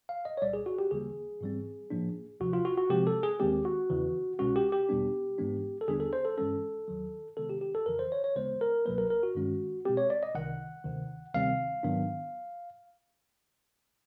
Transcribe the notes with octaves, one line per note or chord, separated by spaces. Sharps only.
F5
D#5
C#5
C2 A#2 G3 D5
G#4
F#4
G4
D2 C#3 E3 G3 A#3 G#4
G#2 E3 G3 C4
A2 F3 A#3 D4
D2 C3 F3 F#4
F4
F#4
F#4
C3 F3 G#3 C4 G4
A4
G#4
D#2 D#3 G#3 C4 G4
F#4
E2 C#3 E3
C2 B2 G#3 C#4 F#4
G4
G4
E2 B2 G3 B3 D4
G#2 E3 G#3 B3 D4
A4
D#2 D3 G3 B3 D4 G#4
A4
C5
A4
G2 E3 G#3 C#4 A4
D#2 D#3 F#3
C3 D#3 G#3 B3 A4
G4
G4
A4
F2 C#3 E3 A#4
C5
C#5
C#5
D2 C#3 E3 G#3 B3 C5
A#4
C#2 B2 F#3 A#3 B4
A#4
A#4
F#4
G2 D#3 G#3 C#4
B2 G#3 C4 G4
C#5
D5
D#5
C2 C3 D#3 F#5
D2 C3 D#3
D2 C3 D#3 G3 C4 F5
G#2 D#3 F#3 B3 D4